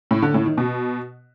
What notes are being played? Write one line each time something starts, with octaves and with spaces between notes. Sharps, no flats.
A2
D3
A2
D#3
B2